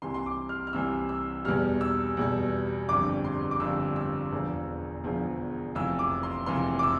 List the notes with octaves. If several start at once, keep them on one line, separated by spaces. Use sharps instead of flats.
C2 C3 E3 C6
C6
D6
F6
F6
C2 C3 E3 E6
E6
E2 B2 G3 F6
E6
E2 B2 G3
G1 F2 D3 G3 D6
C6
D6
G1 F2 D3 G3 E6
E6
E1 E2 D3 F3
E1 E2 D3 F3
F1 F2 E3 E6
D6
C6
F1 F2 E3 C6
D6
E6